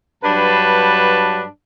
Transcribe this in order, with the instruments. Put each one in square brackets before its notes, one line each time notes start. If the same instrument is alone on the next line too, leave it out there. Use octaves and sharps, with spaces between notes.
[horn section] G2 F#3 D4 B4 A5